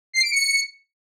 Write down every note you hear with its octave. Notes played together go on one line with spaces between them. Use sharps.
C7
D7
C#7